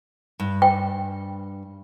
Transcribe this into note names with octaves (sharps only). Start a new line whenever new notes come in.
G2
G5